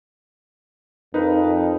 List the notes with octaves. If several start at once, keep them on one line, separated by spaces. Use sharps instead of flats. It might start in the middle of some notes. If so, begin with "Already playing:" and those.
F2 D#4 A#4 B4